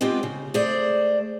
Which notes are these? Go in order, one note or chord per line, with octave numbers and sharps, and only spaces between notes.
G#3 B3 C4 F4 G4
C#3
A3 G#4 C5 D5